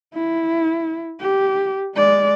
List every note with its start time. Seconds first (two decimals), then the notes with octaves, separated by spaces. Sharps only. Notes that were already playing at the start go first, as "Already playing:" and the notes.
0.14 E4
1.20 G4
1.95 G#3 D5